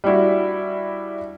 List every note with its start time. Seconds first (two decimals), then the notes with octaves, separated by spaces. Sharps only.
0.04 G3 D4 E4 F#4